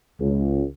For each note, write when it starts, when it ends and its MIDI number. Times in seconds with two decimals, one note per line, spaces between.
0.20 0.63 37